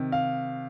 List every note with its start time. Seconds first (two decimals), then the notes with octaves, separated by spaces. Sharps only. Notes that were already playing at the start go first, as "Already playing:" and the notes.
Already playing: C3 D#3
0.12 F5